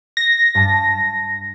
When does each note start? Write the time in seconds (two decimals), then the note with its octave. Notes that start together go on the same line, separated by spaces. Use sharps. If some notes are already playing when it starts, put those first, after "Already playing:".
0.17 A#6
0.55 G2 A5